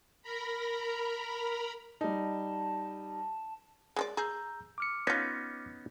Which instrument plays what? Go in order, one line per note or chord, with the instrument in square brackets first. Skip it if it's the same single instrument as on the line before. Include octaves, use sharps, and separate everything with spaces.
[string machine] A#4 A#5 B5
[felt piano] G3 D#4 [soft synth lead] A5
[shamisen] G#3 A4 D5
[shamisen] G#4 [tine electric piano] A#5 E6 G6
[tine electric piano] D6 F6 C#7
[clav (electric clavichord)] B3 C#4 D#4 [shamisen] F4 C#5